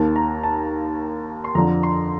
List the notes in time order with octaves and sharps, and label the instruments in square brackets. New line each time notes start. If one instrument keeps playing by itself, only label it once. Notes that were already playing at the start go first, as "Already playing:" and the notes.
Already playing: [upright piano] D#2 D#3 A#3 A5
A#5
A5
C6
F2 D3 F3 A#5
C6